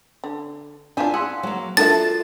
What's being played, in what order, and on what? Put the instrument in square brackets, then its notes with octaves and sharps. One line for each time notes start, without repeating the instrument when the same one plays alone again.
[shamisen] D3
[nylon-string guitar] D4 G#5 [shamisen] E4 F4 [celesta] D5 F5
[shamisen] G#4 [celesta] F5 C6 E6 [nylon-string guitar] F#5
[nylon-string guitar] F#3 A#3
[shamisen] D4 A#4 E5 [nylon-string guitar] F4 F#4 A5 [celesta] A4 [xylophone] A6